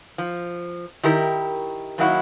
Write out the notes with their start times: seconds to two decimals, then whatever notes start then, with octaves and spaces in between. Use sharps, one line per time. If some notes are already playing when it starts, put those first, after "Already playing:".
0.18 F3
1.03 D#3 E4 G4 A#4
1.98 F#2 D#3 F#3 A#3 E4 F#4